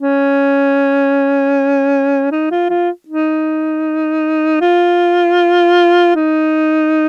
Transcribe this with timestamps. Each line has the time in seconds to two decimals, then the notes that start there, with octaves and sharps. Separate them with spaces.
0.02 C#4
2.32 D#4
2.51 F4
2.70 F4
3.08 D#4
4.61 F4
6.15 D#4